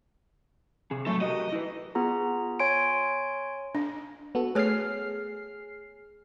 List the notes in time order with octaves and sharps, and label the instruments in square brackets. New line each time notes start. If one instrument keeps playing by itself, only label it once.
[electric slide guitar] C3 G#4
[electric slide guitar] A2 F#3 [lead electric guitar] A3
[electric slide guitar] F#4 G4 A#4 [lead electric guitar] D#5
[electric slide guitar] E4 B4
[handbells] B3 F4 G#4 A#5
C#5 G#5 C6 D7
[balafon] D4
[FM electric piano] B3 F#4 A4
[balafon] A3 C#5 [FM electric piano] G#4 F6 C7